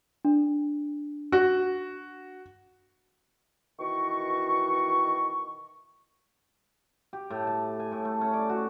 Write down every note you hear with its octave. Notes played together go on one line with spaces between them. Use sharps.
D4
F#4
B2 D#3 E3 F#4 C#6
G4
A2
A5
G#5
A2
A3
C#4
D5
F#4